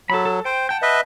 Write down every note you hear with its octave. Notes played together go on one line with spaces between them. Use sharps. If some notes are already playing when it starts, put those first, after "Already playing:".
F#3 A4 B5
A4
C5 G5
F#5 G5 A5 G6
B4 D#5 E5